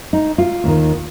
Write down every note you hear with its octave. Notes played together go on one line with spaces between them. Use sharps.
D#4
F4
D#2 D#3